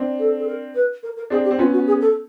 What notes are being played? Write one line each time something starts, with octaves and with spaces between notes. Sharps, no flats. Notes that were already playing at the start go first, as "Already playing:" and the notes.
Already playing: C4 D4
A4
A4
A#4
B4
A#4
A#4
C4 D4 G#4
G4
C4
B3 C#4 F4
F#4
G#4
A4